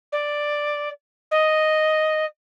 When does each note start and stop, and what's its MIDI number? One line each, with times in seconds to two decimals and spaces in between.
0.12 0.88 74
1.31 2.24 75